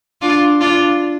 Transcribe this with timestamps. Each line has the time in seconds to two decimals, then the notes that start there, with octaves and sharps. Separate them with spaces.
0.22 D4 F4
0.61 D4 F4